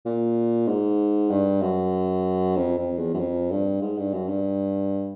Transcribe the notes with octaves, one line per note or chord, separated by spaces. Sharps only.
A#2
G#2
G2
F#2
F2
F2
E2
F#2
F2
G2
G#2
G2
F#2
G2